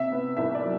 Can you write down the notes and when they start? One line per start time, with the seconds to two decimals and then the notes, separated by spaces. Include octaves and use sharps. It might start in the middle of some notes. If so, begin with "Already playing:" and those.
Already playing: C3 E5
0.12 B3
0.37 C2 E5
0.55 D5
0.63 F#3